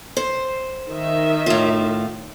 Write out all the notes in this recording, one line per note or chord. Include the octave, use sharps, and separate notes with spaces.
C5
D#3 D#5 E5
A2 F4